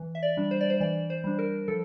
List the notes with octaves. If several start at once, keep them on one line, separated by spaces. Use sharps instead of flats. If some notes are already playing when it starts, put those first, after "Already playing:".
Already playing: E3
E5
D5
G3 D4
C5
D5
C5
E3 D5
C5
G3 D4
A#4
F3 A4